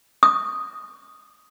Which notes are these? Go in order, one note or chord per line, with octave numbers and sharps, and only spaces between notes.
D#6